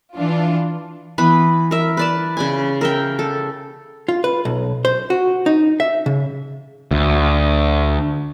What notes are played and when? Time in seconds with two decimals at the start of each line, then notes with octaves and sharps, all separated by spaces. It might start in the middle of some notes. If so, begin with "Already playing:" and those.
0.14 E3 D4 F4
1.18 E3 B3 B4 B5
1.71 A#4 E5
1.97 B4 D5 A5
2.37 C#3 D5 G#5
2.81 A#4 E5 G5
3.19 A4
4.08 F4
4.24 B4
4.45 B1
4.85 C5
5.10 F#4
5.46 D#4
5.80 E5
6.06 C#3
6.91 D2